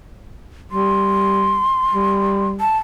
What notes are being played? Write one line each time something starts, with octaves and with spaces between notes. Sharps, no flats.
G3 C6
G3
A5